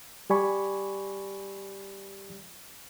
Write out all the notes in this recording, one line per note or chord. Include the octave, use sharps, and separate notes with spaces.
G3 G4 D5 G#5 B5 C#6